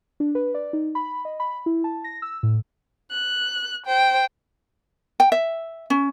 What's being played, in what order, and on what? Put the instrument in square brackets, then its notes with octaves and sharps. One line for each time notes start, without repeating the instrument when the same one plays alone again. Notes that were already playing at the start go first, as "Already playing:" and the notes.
[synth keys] D4
B4
D5
D#4
B5
D#5
B5
E4
A5
A#6
E6
A2
[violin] F#6
C5 G5
[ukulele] G5
E5
C#4